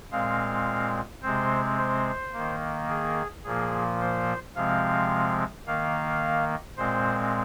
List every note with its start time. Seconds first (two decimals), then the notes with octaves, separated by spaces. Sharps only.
0.12 A#2 G#3 C4 F5
1.22 C3 G#3 C4 C5
1.78 C5
2.33 D#3 A#3
2.89 G#4
3.44 A#2 F3 A#3 G#4
4.00 C5
4.55 C3 F3 G#3 C4 F5
5.66 D#3 A#3 F5
6.77 A#2 G#3 C4 C5